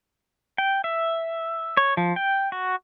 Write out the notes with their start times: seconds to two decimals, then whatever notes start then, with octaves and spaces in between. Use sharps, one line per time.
0.58 G5
0.84 E5
1.77 C#5
1.97 F3
2.16 G5
2.52 F#4